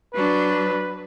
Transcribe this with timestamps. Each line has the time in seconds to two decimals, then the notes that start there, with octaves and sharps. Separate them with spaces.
0.14 F#3 D4 B4